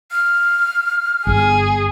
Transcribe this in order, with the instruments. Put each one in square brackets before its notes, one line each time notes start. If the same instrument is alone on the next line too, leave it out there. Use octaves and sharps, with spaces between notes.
[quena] F6
[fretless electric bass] G1 [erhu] G#4